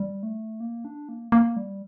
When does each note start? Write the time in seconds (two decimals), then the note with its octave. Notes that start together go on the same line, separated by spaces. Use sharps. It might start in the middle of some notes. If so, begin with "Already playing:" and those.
Already playing: G3
0.23 A3
0.60 A#3
0.85 D4
1.09 A#3
1.32 A#3
1.57 G3